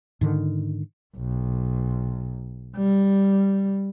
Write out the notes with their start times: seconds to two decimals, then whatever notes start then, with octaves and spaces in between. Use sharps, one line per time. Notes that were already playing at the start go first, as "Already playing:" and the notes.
0.21 G#2 D3 D#3
1.17 B1
2.77 G3